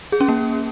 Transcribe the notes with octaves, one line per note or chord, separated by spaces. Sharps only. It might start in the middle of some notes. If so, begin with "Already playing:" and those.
G#4
C#4
A#3